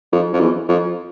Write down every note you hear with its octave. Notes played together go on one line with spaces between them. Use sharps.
F2
F2
E2
F2